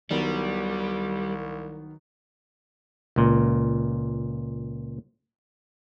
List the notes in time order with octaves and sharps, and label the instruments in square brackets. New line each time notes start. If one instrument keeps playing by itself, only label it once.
[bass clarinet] C2 [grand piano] D#3 F#3 B3 [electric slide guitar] G3
[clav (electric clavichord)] C#2 A#2